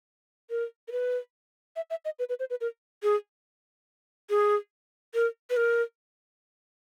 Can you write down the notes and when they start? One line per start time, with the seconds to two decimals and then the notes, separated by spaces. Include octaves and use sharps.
0.50 A#4
0.88 A#4
0.92 B4
1.76 E5
1.90 E5
2.05 D#5
2.19 B4
2.29 B4
2.40 C5
2.50 B4
2.61 A#4
3.03 G#4
4.30 G#4
5.14 A#4
5.50 B4
5.57 A#4